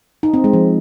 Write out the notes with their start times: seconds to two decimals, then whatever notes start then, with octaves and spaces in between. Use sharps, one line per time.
0.23 D#4
0.34 C4
0.44 G#3
0.53 F3